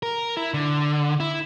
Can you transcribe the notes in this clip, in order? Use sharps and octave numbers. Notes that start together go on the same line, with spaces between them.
A#4
E4
D3
E4